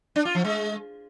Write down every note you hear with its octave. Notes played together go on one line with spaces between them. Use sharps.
D4
F4
F3
G#3